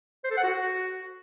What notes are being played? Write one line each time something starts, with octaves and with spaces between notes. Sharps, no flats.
C5
A4
F#5
F#4